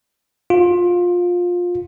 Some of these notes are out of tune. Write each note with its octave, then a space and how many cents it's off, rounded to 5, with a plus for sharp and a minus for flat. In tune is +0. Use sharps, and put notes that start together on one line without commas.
F4 +20